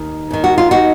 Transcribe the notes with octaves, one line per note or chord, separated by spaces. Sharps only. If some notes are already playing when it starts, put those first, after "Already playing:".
Already playing: D#2 D#3
D#2 D#3
F#4
F4
D#4 F#4